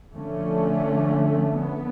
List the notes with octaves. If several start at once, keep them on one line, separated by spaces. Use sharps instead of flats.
D3 F3 A3 C#4
B3